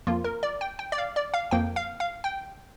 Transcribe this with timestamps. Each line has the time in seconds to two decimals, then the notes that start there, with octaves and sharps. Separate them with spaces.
0.07 F2 F3 A#3 F4
0.24 A#4
0.43 D5
0.61 G5
0.79 G5
0.92 D5
0.98 F5
1.16 D5
1.34 F5
1.51 F2 F3 A#3 G5
1.76 F5
2.00 F5
2.24 G5